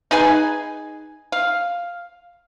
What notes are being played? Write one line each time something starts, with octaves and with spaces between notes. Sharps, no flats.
D#4 G#4 B4 G#5
F5